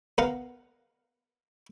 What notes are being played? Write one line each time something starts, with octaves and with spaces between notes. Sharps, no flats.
B3 A#4 F5 F#5